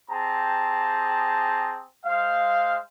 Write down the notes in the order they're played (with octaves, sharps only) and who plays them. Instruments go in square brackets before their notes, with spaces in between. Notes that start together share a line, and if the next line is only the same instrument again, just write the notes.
[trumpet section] C4 G4 G#4 A5 A#5
G#3 C5 F5